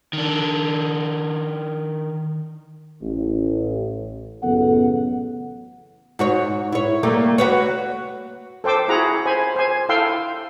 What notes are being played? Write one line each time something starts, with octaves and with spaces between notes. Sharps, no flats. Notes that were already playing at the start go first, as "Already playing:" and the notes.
D#3 D4
A1
A1 F#2 C#3 B3 A4 F#5
G#2 F#4 C#5
E4 C#5
G3 A3 A#3
F#4 B4 C#5
A4 C5 G5 D6 E6
E4 F#4 G#4 F#5 A#5
C5 G#5 B5
C5 G#5
E4 A4 F5 G5 C6 E6